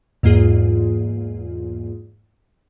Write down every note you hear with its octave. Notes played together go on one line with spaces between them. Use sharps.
E2 G#2 A#3 F4 G#4